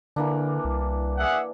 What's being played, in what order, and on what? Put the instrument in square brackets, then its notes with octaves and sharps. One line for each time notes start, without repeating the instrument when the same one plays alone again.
[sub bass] D3 [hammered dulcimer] E3 A#3 D4
[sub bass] C2
[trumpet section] G#4 E5 F#5